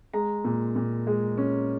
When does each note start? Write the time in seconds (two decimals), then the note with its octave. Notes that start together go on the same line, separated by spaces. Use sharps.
0.13 G#3 A#5
0.45 A#2
0.76 A#2
1.07 G#3
1.38 C#4